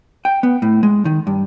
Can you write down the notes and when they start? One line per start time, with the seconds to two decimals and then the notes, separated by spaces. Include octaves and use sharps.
0.25 G5
0.43 B3
0.62 A2
0.83 G#3
1.05 D#3
1.27 G2